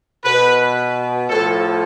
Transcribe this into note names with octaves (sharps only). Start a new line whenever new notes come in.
B2 B4
A2 F3 A4